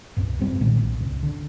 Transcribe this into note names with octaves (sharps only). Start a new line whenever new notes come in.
C#2 G2
F#1 G#2 G3 C4
B1 A#2 D#3 G#3
A#1
G1 C#2
D3